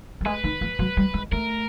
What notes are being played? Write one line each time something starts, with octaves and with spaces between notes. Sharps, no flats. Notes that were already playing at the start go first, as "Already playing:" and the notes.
G3
G#3 B4
D#3
F3
F#3
G3
G#3
A3 A#4